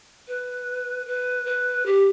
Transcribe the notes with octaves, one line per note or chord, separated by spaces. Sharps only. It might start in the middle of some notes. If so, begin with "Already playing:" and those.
B4
B4
B4
G4